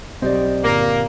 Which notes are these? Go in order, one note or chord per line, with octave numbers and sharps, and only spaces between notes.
B1 C4 G4 C5 D5 D#5
G1 A#2 A#3